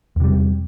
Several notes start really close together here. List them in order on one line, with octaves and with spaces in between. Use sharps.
E2 C3 G3